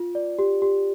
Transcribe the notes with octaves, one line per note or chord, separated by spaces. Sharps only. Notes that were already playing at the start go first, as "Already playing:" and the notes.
Already playing: F4
D5
G4
G4